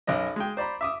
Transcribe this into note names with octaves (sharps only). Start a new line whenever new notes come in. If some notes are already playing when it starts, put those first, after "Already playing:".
B1 F#2 C#4 D#5
G#3 G5
C5 D5 A#5 B5
E5 D6 D#6